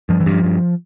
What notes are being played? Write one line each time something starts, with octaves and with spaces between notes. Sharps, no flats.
G2 F3
E3
G2
F3
G2